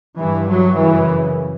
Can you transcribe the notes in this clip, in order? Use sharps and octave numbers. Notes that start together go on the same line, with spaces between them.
G2 E3
F#3
F#2 C#3 E3